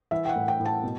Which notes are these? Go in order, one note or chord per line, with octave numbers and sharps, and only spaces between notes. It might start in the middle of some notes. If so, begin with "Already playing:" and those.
E3 E5
G5
F#5
A2
G5
A2
A5
B2